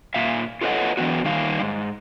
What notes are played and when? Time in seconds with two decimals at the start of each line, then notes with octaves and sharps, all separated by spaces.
0.14 A#2 E5 F5
0.61 F4 A4 B4 C#5 D#5 F#5
0.97 E3 F#3 B3 F#4
1.24 D#3 G3 D#4 F5
1.62 G#2